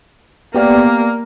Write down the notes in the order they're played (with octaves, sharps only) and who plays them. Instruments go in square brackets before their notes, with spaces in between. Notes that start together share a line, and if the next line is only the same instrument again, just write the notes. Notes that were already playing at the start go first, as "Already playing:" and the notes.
[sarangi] A#3 [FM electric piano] B3 G4 D5